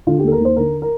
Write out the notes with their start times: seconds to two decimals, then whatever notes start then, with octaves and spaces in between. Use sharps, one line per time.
0.07 D3 F4
0.19 G4
0.24 D#2 A4
0.32 A#4
0.40 D#2 C5
0.57 D3 A#4
0.82 A#4